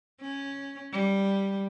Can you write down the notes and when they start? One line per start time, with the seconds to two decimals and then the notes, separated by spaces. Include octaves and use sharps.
0.21 C#4
0.92 G3